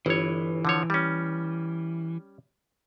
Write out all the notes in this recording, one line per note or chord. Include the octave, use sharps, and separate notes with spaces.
G1 E3 C#5
D3 F3 C#5
G3 C#4